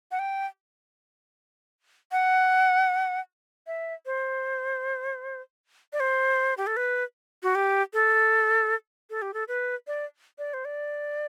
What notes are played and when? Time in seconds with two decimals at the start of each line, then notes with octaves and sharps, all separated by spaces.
0.11 F#5
0.19 G5
2.12 F#5
3.67 E5
4.06 C5
5.93 D5
6.00 C5
6.57 G4
6.67 A4
6.76 B4
7.43 F#4
7.55 G4
7.93 A4
9.10 A4
9.22 G4
9.33 A4
9.48 B4
9.87 D5
10.38 D5
10.53 C5
10.65 D5